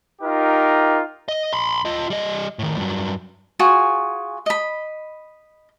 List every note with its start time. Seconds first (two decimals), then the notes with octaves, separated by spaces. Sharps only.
0.22 D#4 F4 G4 A#4
1.28 D#5
1.53 B5 C6
1.85 F4 D#5
2.10 G3 D#5
2.59 A2 D#3
2.78 G2 F#3
3.59 F4 F#4 G#4 G#5
4.46 D#5 B5